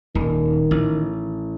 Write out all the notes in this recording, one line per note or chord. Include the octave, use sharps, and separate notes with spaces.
D#1 D#3
A1